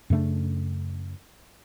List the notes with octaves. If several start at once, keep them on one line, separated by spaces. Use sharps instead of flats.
F#2 C#3 A3 D4